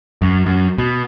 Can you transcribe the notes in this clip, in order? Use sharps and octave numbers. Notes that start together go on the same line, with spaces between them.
F#2
F#2
B2